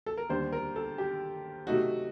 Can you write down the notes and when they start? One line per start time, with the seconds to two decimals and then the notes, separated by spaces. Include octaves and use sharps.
0.06 A4
0.17 A#4
0.29 D#2 D3 G3 D4 C5
0.52 A#4
0.76 A4
0.98 G4
1.67 C3 F#3 A3 D#4 F#4